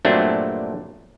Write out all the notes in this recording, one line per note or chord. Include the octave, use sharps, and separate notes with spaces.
G2 A#2 F#3 A3 C4 D4